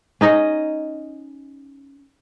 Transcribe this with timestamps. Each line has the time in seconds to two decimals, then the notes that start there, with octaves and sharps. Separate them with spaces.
0.21 C#4 D#4 D#5